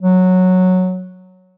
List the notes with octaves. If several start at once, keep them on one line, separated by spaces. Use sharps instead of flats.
F#3